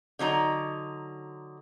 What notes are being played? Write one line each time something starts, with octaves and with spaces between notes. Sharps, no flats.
D3 F#3 D#4 A#5